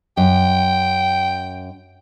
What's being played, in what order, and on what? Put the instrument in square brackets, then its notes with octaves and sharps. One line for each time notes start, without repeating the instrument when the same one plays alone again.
[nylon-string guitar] F#2 [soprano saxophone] G5